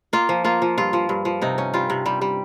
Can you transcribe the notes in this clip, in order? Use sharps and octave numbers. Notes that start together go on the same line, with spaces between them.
A#3 F4
F3
A#3 F4
F3
G2 F4
F3
G2
F3
C3 D#4
C#4
G3 F4
C3
G3
G3